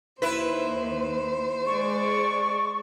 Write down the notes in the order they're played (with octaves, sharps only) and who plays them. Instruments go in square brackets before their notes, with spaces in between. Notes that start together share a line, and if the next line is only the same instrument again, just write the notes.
[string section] D#2 [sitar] E4 B4 [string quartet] C5
[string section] G#3 D5 [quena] C#6